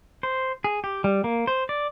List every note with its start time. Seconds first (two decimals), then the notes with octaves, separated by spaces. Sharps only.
0.23 C5
0.64 G#4
0.84 G4
1.04 G3
1.24 A#3
1.47 C5
1.69 D5